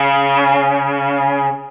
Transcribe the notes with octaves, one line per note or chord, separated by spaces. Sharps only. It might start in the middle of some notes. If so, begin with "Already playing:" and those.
Already playing: C#3